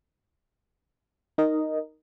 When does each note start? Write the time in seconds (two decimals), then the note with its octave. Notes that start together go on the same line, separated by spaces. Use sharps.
1.38 D#4 A#4 D#5